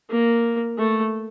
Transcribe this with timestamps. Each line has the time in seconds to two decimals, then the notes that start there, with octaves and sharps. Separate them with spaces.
0.10 A#3
0.78 A3